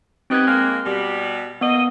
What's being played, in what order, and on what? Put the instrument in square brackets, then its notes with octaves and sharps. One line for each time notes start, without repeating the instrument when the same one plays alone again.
[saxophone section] G3 B3 D#4 [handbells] C4 F#6 G#6
[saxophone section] G#3 A#3 [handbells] F6
[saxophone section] B2 G3
[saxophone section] A#3 D#5 [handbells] B3